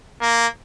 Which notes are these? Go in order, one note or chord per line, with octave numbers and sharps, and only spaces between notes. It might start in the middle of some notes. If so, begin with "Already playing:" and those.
A#3